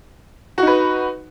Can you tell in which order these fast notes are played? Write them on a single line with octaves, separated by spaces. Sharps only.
F#4 D#4 B4